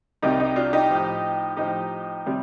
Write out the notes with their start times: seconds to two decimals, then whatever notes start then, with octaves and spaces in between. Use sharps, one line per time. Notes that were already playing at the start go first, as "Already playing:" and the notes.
0.22 C2 C3 G3 D#4 G4
0.39 D#4 G4
0.56 D4 F4
0.73 D#4 G4
0.91 A2 F3
1.57 A2 F3 D#4 G4
2.26 C3 G3